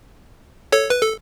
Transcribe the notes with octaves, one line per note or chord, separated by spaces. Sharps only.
A4 C#5
B4
A4